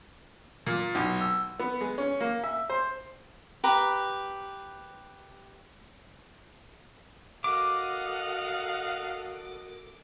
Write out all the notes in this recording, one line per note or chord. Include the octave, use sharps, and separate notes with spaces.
A#2
B1
E6
B3
G#3
C#4
A#3
E5
C5
G4 B4 A#5
F#4 A4 A#4 D#5 F5 F#5 D6